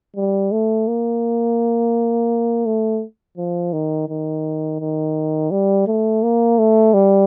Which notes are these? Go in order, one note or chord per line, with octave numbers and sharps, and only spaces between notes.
G3
A3
A#3
A3
F3
D#3
D#3
D#3
G3
A3
A#3
A3
G3